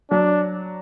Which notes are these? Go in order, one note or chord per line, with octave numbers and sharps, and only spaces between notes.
F#3 D4